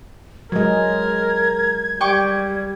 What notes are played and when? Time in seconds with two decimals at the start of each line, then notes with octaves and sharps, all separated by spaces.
0.52 F#3 G#3 A#4 G#6
2.01 G3 G5 C#6 D6